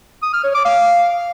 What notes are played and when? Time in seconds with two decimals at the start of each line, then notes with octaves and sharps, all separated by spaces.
0.23 D#6
0.33 F6
0.44 C#5
0.55 D6
0.65 F5